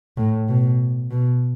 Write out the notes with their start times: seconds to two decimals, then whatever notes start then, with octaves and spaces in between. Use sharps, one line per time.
0.17 A2
0.49 B2
1.11 B2